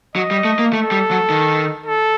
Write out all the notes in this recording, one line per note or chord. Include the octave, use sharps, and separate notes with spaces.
F#3 D#5
G3
A3
A#3
A3 A4
G3
F#3
D#3
A4